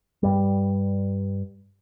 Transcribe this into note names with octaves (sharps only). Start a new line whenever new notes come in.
G2 G3